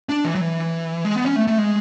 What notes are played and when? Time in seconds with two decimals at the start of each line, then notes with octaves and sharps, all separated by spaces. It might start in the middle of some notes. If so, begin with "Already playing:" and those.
0.09 D4
0.25 E3
0.35 F#3
0.41 E3
1.04 G#3
1.15 B3
1.26 C#4
1.36 A3
1.47 A3
1.58 G#3